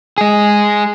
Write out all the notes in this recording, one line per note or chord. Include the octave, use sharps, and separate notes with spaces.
G#3 G#4